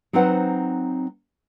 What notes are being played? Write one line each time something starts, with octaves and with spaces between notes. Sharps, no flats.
F#3 C4 D#4 B4 C5 F#5